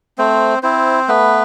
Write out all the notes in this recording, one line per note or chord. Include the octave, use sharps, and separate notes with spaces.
A3 C4 C5
C4 E4 C5
A3 B3 B4